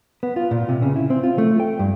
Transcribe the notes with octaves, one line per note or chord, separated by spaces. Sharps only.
B3
F4
A#2
C3
C#3
E4
C4
F4
A3
G5
G2